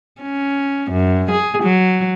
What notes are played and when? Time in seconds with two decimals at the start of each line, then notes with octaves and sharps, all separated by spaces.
0.22 C#4
0.91 F#2
1.31 G#4
1.63 F#3